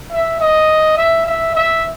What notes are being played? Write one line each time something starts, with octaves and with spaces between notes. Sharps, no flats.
E5
D#5
E5
E5
E5